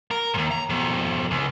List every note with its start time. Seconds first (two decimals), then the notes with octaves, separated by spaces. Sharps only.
0.11 A#4
0.34 D#2 G#2
0.51 A#5
0.70 F2 B2
1.31 C#2